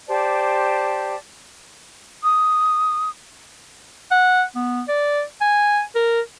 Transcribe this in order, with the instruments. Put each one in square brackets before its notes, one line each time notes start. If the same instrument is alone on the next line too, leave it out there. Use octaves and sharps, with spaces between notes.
[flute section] G4 C5 D5 A5
[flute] D#6
[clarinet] F#5
B3
D5
G#5
A#4